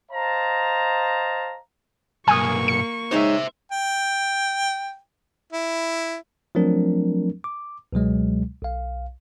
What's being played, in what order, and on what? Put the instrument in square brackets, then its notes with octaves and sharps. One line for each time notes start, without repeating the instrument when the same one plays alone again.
[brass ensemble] C5 D#5 F5 A5 A#5
[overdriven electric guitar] B1 G2 [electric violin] A#3 C#6 [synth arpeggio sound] G#5 D#6
[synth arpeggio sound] C#7
[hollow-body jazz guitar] G#3 D#4 C#5 [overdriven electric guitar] C5 E5
[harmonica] G5
E4
[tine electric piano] F3 F#3 A3 C4 D4 A#4
D6
C#2 B2 F#3 G#3
B1 F5